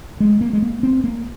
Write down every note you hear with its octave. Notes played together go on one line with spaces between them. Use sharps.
G#3
A#3
G#3
A#3
C4
A#3